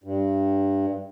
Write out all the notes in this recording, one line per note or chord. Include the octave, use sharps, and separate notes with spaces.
G2